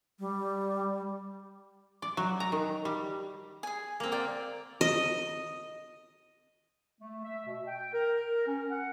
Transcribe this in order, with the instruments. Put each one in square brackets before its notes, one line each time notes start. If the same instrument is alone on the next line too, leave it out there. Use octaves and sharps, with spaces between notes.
[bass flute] G3
[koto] D5
F#3
A#5
D#3
G3
[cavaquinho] G#4 G#5
[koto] A#3 C4
[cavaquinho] A#4 D5 G5
[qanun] D#5
[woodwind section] A3
E5
B2
G5
A#4
C#4
F#5